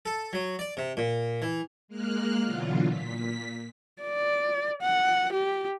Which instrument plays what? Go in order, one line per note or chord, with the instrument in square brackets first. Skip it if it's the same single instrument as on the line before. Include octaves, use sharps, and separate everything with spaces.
[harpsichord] A4
F#3
D5
C3
A#2
E3
[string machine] G#3 A#3 F6 F#6
B2 D3 E3 F#3 F4
A#2 B6
[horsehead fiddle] D5
F#5
G4